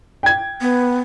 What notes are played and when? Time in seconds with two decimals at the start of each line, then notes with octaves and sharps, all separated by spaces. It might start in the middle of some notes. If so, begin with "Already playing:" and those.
0.23 G5 G#6
0.61 B3